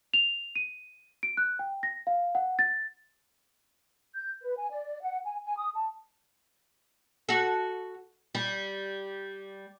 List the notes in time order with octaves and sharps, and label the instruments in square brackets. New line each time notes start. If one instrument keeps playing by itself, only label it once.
[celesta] F7
D#7
D7
F#6
G5
A#6
F5
F#5
A6
[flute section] G6
B4
G#5
D5
F#5
G#5
G#5
D#6
A5
[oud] F#4 A4
G3